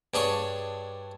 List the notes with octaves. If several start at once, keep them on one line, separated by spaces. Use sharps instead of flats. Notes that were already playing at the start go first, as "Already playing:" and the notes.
G2 D4 G#4 C#5